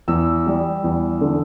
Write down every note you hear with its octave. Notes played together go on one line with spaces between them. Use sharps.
E2 E6
G3
E2
D3